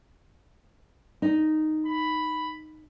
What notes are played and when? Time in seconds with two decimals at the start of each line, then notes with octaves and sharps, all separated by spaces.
1.22 D#4
1.86 B5